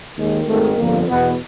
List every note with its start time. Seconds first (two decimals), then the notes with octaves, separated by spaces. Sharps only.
0.17 D#2 D#3 G#3
0.47 G#1 G#2 D#3 A3
0.76 G1 F2 D3 F3 A#3
1.06 E2 B2 B3